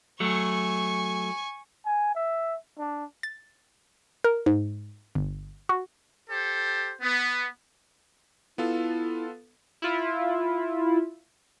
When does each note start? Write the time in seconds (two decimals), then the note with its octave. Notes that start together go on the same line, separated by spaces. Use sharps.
0.20 F#3 A3 G#5 C#6
1.85 G#5
2.15 E5
2.78 D4
3.23 A6
4.24 A#4
4.46 G#2
5.15 G1
5.69 F#4
6.30 G4 A4 C5
7.01 B3
8.58 B3 E4 F4 A4
9.82 E4 F4